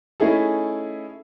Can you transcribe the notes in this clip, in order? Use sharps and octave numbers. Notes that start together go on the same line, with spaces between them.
A3 C#4 D#4 E4 G#4 A4